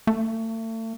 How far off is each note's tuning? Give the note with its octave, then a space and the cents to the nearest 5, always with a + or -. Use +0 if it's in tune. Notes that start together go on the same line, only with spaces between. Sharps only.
A3 +35